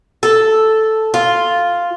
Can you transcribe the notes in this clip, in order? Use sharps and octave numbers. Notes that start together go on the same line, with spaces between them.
A4
F4